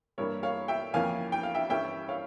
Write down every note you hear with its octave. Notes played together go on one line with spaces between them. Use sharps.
G2 E3 G3 A#3 A#4 C#5
C#5 F5
E5 G5
F2 E3 A#3 C#4 F5 G#5
G5
F5
E5 G5
G2 E3 G3 C#4 E5 G5
C#5 F5